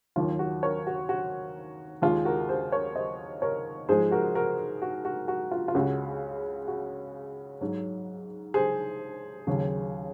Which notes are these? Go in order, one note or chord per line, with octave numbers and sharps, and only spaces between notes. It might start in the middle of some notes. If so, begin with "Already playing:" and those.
D#2 D#3 F#3 F4
F#4
A#4 C#5
F#4
F#4
D#2 D#3 G#3 F4 G#4
F#4 A#4
G#4 C5
A#4 C#5
C5 D#5
A#4 C#5
G#2 F3 G#3 G#4 C5
F#4 A#4
F#4 A#4
F#4
F#4
F#4
F4
F4
C#2 C#3 G#3 F#4
F#4
G#2 F#3
G#4 C5
D#2 C#3 F#3